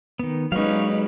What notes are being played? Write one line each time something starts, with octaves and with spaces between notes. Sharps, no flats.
D#3 B3
F#3 G#3 C#4 D#4 B4 F5 C#6